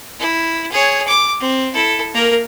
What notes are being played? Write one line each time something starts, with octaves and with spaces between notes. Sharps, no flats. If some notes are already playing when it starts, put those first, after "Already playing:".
E4
G#4 C#5
D6
C4
E4 A4
A#3 A#4